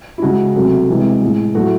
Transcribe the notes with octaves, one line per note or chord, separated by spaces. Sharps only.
E4
C#3 G#3 F#4
C3 F#3 A3
C3 E3 G#3
A2 G#3
A2 F#3 A3 F#4